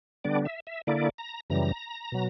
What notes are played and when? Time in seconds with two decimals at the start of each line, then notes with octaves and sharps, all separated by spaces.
0.24 D3 G3 B3 D4 D5
0.45 E5
0.67 E5
0.87 D3 A#3 E4 D5
1.18 A#5
1.50 F#2 C#3 E3 G3 A#5
2.12 B2 F#3